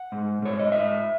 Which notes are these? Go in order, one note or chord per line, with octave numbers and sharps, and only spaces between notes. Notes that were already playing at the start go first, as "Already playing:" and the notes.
Already playing: F#5
G#2
G#2 C#5
D#5
G#2 E5